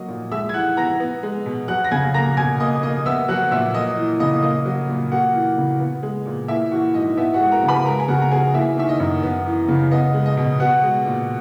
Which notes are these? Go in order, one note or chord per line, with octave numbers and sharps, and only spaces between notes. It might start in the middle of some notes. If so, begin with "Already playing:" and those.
Already playing: F#3 A#3 D#5
A#2
G#3 E5 E6
G#6
E3 F#5 F#6
B3 A#5 A#6
B3
G#3
B2
F#3 F#5 F#6
A#6
C#3 G#5 G#6
A#3 A#5 A#6
B2 G#5 G#6
A#3 D#5 D#6
A#3 D#5 D#6
B3 E5 E6
F#3 F#5 F#6
A#2 E5 E6
A#3 D#5 D#6
E3
C#3 D#5 D#6
A#3 D#5 D#6
F#3
A#2
A#3 F#4 F#5
E3
C#3
B3
G#3
A#2
A#3 E4 E5
E3 F#4 F#5
G#2 D#5
B3 E4 E5
F#4 F#5
G#3
A#4 A#5
C#3
B4 B5
G#3 A#4 A#5
G#5
C#3 F#4 F#5
A#5
B3 G#4 G#5
A#3 E4 E5
D#3 E5
D#5
F#2
B3
E3
C#3
B3 D#5
G#3
D#5
B2
B3 F#4 F#5
G#3
A#2